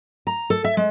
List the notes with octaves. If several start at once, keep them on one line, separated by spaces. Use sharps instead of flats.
A#5
A4
E5
G#3